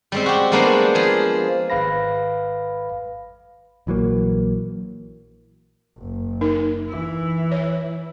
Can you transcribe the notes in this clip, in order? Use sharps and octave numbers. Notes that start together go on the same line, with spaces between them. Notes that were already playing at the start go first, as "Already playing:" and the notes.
G3 G#3 C4
F#4 G4
G3 G#3 A#3 B3 D4 C5
F3 G#4
G#1 B4 F5 B5 A#6
A#1 E3 F#3 A#3
F#1
D#4 A#4
E3 E4
C#5